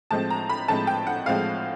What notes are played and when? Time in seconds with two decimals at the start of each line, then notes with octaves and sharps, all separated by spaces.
0.10 A2 F3 G#3 C4 A5
0.30 A#5
0.49 B5
0.68 A2 F3 G#3 C4 A5
0.87 G5
1.07 F#5
1.26 A2 F3 G#3 C4 F5